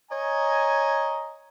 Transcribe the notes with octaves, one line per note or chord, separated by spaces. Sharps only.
C#5 D#5 G#5 A#5